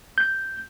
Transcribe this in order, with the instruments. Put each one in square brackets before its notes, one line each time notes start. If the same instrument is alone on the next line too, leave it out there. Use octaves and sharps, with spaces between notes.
[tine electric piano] G6